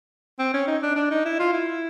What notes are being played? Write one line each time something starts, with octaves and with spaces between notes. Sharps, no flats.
C4
C#4
D#4
D4
D4
D#4
E4
F4
E4